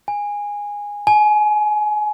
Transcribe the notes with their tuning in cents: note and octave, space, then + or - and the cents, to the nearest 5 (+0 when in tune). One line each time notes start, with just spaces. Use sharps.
G#5 -15
G#5 +25